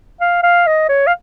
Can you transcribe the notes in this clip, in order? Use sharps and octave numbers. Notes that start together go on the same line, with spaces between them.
F5
F5
D#5
C#5
F5